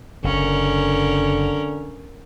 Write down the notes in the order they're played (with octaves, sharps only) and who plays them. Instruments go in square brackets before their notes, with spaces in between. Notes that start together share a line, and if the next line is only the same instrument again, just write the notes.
[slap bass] F#1 [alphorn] D3 [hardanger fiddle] C#4 A#4